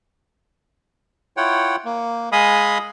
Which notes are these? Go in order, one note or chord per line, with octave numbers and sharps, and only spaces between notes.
E4 F4 C#5 F#5 G5
A#3
G#3 D#5 F5 G#5 B5 D#6